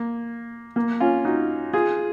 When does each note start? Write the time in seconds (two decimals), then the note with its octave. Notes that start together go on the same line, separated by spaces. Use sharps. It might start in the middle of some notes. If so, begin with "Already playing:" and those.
Already playing: A#3
0.76 A#3
1.00 C#4 F4
1.25 D#4 F#4
1.73 F4 G#4